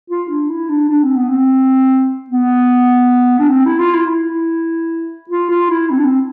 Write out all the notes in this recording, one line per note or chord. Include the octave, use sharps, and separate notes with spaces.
F4
D4
E4
D4
D4
C4
B3
C4
B3
D4
C4
E4
F4
E4
E4
F4
F4
E4
C4
D4
C4